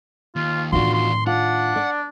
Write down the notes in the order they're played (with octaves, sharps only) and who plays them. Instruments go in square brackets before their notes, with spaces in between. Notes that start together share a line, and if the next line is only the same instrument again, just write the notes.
[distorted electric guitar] D#2 [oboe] F4
[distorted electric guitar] E2 D4 [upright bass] A2 D#3 [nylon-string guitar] F4 F#4 [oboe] C6
[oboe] C6
[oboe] D4 [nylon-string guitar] F4 [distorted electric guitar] F#5
[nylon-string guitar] D5